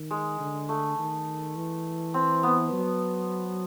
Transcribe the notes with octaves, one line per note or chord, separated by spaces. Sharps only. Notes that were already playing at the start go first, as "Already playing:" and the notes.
Already playing: D#3
G#3
D3
A3
D#3
E3
C4
B3
F#3